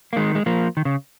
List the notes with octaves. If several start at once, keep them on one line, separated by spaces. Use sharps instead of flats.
A#3
D#3 G#3
G#3
F3 A#3
D#3
C#3